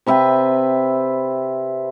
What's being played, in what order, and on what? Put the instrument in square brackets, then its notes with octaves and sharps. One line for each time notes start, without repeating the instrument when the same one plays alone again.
[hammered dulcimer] C3 B4 E5 G5